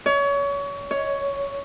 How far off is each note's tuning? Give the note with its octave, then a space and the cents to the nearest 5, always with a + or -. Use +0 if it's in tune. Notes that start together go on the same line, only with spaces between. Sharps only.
C#5 +30
C#5 +10